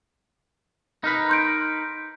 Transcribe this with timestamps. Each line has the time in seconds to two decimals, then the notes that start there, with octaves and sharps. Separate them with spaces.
1.04 D#4 A#4 B4
1.29 C6 G6 D7